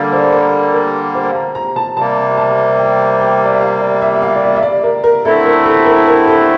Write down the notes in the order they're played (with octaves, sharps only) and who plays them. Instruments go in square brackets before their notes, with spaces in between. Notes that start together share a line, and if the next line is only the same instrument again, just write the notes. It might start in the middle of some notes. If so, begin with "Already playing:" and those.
Already playing: [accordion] D3 G3 A#3 [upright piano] D5
[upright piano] C5
A#4
A#4
C5
A#5
A#5
A5
[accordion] C3 G3 A#3 [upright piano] A5
[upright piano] A5
G5
G5
D5
E5
F5
D5
E5
E5
F5
D5
E5
E5
D5
A#4
A#4
[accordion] D3 A3 C4 E4 [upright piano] A4
[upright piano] A#4
A4
A#4
A#4
A4